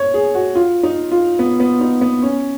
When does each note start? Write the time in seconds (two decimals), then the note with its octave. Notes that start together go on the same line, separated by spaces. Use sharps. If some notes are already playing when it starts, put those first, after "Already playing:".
Already playing: C#5
0.14 G#4
0.35 F#4
0.55 F4
0.83 D#4
1.11 F4
1.39 B3
1.60 B3
1.81 D#4
2.01 B3
2.22 C#4